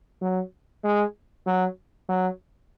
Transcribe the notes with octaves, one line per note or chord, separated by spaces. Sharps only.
F#3
G#3
F#3
F#3